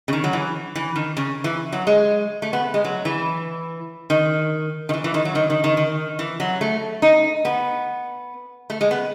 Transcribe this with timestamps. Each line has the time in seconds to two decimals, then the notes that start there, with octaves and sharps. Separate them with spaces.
0.08 C#3
0.13 D#3
0.24 F#3
0.33 E3
0.75 E3
0.96 D#3
1.17 C#3
1.44 E3
1.72 F#3
1.87 G#3
2.42 A3
2.53 B3
2.74 G#3
2.84 F#3
3.05 E3
4.10 D#3
4.89 D#3
4.94 E3
5.04 E3
5.14 D#3
5.25 F#3
5.35 D#3
5.50 D#3
5.64 D#3
5.77 D#3
6.19 E3
6.40 F#3
6.61 A3
7.02 D#4
7.45 B3
8.70 A3
8.81 G#3
8.91 B3